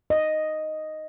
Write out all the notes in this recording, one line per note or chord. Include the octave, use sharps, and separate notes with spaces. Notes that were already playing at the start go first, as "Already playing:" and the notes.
D#5